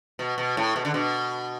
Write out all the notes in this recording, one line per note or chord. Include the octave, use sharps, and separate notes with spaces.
B2
B2
A2
B2
D3
B2